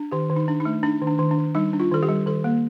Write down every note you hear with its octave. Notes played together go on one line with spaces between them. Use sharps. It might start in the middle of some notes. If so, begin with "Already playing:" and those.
Already playing: D4
D#3 G4
D#3
D#4
D4
D#4
A3
D4 D#4
D#3
D4
D#3
D4
D#3
G3 D#4
D4
F4
D#3 A4
G4
G3
D#3 A4
A#3